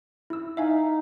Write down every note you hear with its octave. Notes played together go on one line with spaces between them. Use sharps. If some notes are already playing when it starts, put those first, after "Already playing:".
E4 E6
D#4 E5 F5 G#5